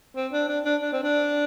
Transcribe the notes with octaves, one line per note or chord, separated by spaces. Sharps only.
C4
D4
D4
D4
D4
C4
D4